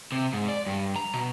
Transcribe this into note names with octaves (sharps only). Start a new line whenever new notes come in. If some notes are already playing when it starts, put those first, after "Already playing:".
C3
G#2
D5
G2
A#5
B2